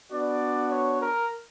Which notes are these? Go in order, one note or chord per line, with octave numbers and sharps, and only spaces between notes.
B3 D4 F#4 D5
C#5
A#4